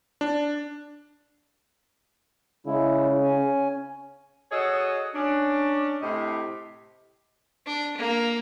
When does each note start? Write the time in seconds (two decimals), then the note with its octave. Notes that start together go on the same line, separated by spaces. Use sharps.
0.21 D4
2.66 C#3 G#3 E4
3.23 C#4 G#5
4.52 F#4 G#4 A4 C#5 D#5
5.14 C#4 D4
6.01 A2 C3 G4 D#5
7.66 D4
7.97 A#3